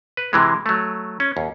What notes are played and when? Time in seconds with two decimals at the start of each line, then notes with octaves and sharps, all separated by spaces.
0.17 B4
0.33 C3 E3 G#3
0.66 F#3 A3
1.20 C#4
1.37 D#2